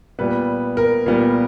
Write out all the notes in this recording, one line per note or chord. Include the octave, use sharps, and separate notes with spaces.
A#2 G3 B3 B4
A#4
A#2 G3 B3